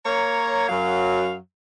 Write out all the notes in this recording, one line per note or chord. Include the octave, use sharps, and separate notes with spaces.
A#3 C#5 A#5
F#2 F#3 F5